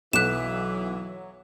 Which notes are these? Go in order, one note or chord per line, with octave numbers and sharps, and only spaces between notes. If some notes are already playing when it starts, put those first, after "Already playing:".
B1 E3 F#3 D6 F#6 B6 E7